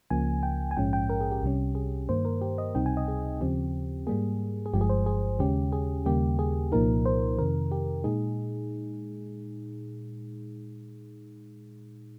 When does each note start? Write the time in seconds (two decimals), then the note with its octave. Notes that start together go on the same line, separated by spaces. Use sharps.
0.10 C#2 C#3 F3 A#3 G#5
0.43 G5
0.71 G#5
0.76 A#1 G#2 F3 G#3 C#4 G5
0.93 G5
1.09 A#4
1.21 G#4
1.32 G4
1.42 C2 C3 G3 C#4
1.75 G#4
2.09 G2 D#3 A#3 C5
2.25 A#4
2.41 G4
2.58 D#5
2.75 C#2 C3 G3 C4 D#4 G5
2.86 G#5
2.97 D#5
3.08 G#4
3.41 D#2 C#3 F3 C4 G4
4.07 G#2 G3 A#3 G#4
4.66 G#4
4.73 G1 G2 F3 G#3 G4
4.81 G#4
4.89 C5
5.06 G#4
5.39 D#2 C#3 G#3 C#4 G4
5.73 G#4
6.06 D#2 C#3 G3 A#3 G4
6.39 G#4
6.72 C2 A#2 F3 A#3 D#4 A#4
7.06 C5
7.38 F2 C3 D#3 A#4
7.71 G4
8.04 A#2 G#3 D#4 G#4